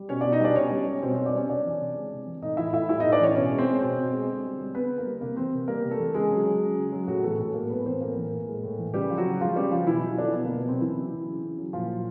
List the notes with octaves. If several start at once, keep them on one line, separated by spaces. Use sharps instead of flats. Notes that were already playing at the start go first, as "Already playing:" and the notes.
Already playing: G3
B2 C#4 C#5
B2 D4 D5
D#4 D#5
G3 D4 D5
B2 C#4 C#5
G3
G3
B2 C4 C5
B2 C4 C5
D4 D5
G3 C#4 C#5
C3 D4 D5
E3
C3
G#3
C3
E3
A2 D#4 D#5
E3 E4 E5
A2 E4 E5
G3 E4 E5
A2 D#4 D#5
D4 D5
E3 C#4 C#5
B2 C#4 C#5
G#3
C4 C5
G#3
B2 C4 C5
B2
G#3
D3
G3
G3
D3 B3 B4
D3
A#3 A#4
G3
C3 A#3 A#4
E3 C4 C5
C3
G3 A#3 A#4
C3
A3 A4
E3
C#3 G#3 G#4
F#3
F#3
C#3
C#3
F#3
A2 F#3 F#4
E3 A3 A4
A2 A3 A4
G#3 A#3 A#4
A2 B3 B4
E3 C4 C5
A2 A#3 A#4
E3
A2
G#3
A2
E3
C#3 G3 G4
F3
F#3 F#4
C#3
F3 G#3 F4
C#3 G3 G4
F3 F4
B2 E3 E4
F#3
D3 F#3 D4
B2 B3
B2 A#3
B3
C3 F#3 C4
C#3 E3 E4
F#3
F#3
C#3
C#3
F#3
A#2 F3 F4
F#3